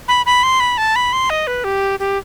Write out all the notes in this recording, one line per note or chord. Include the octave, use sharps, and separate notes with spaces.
B5
B5
C6
B5
A5
B5
C6
D#5
B4
G4
G4